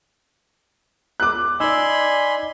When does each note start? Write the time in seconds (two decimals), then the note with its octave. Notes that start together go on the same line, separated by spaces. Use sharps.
1.20 D6 F#6
1.60 D#4 D5 D#5 G#5 B5 C6 E6